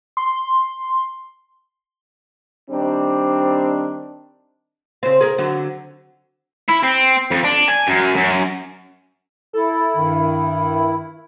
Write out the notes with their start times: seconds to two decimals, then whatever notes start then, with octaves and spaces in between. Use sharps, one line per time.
0.17 C6
2.71 D#3 G3 C4 D4
5.03 C#3 C4
5.21 G#4 A#4
5.38 D3 F#3
6.69 E4
6.83 C4
7.31 F2
7.45 D4
7.69 G#5
7.88 F#2
8.16 F#2
9.54 E4 A4
9.95 G2 D#3